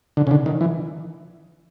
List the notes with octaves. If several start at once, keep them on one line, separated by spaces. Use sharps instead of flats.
D3
C#3
D3
D#3
E3